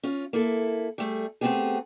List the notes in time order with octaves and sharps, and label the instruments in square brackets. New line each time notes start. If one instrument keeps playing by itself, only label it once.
[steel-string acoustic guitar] C#4 F4
A#3 E4 A4
G3 A3 G#4
A3 B3 C4 F4 G4 G#4